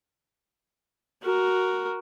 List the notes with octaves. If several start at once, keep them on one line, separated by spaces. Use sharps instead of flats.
F#4 A#4